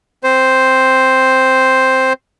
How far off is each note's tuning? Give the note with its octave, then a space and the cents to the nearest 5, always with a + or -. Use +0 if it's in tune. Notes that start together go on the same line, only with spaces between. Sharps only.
C4 +0 C5 +0